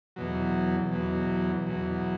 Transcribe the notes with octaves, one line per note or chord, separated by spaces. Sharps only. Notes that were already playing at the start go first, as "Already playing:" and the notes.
E2 B2 F#3
E2 B2 F#3
E2 B2 F#3